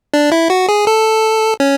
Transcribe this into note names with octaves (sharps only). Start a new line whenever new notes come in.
D4
E4
F#4
G#4
A4
C#4